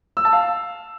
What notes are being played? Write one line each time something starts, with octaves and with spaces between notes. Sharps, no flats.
E6
A5
F5